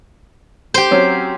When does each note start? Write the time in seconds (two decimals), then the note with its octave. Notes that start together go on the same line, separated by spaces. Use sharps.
0.74 G4 C5
0.91 F#3 C4 C#4